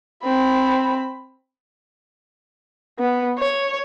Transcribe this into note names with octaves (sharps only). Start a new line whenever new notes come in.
C4 B5
B3
C#5